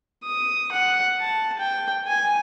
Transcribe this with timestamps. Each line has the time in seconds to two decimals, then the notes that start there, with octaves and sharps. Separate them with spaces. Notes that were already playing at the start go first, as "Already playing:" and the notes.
0.23 D#6
0.72 F#5
1.20 A5
1.59 G5
2.07 G#5